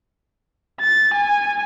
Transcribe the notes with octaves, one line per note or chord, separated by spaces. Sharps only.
A6
G#5